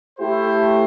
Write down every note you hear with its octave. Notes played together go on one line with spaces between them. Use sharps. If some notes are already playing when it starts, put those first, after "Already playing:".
A3 E4 G4 C5